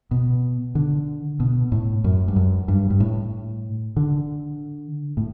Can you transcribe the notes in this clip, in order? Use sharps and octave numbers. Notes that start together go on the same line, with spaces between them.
B2
D3
B2
A2
F#2
G2
F#2
G2
G2
A2
D3
A2